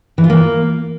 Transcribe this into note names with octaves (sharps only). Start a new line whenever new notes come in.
E3
F4
A#3